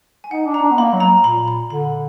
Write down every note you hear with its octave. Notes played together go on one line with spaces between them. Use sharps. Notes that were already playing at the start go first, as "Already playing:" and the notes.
G#5
D#4 F#5
D4
A#5
D4
B3
A#3 B5
F#3
A#5
A#2 B5
B5
D3 B5